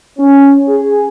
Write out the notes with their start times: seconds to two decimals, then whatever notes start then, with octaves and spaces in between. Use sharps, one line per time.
0.17 C#4
0.67 G#4